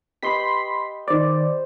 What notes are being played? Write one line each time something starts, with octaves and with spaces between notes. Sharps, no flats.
G4 B4 D#5 B5 C6 B6
D#3 C5 D5